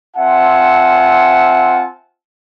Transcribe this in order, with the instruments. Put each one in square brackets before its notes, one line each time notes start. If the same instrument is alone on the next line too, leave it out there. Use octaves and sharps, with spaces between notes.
[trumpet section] C4 F4 E5 F#5 G#5 A5